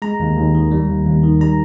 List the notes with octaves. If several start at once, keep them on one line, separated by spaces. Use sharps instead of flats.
G#3 A#5
D#2
D#2
D#3
G3
D#2
D#2
D#3
G3 A#5